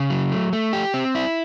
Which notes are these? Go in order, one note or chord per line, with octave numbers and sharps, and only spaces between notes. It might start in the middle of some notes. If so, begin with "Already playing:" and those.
Already playing: C#3
F#3
A3
A3
G4
C4
E4